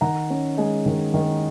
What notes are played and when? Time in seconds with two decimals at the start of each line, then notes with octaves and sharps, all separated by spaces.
0.01 D#3 F#5 A#5
0.30 C#4
0.57 G#3 D#5 G#5
0.86 D#3
1.14 D#3